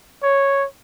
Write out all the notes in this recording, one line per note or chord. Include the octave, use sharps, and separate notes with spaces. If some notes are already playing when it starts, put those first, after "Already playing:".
C#5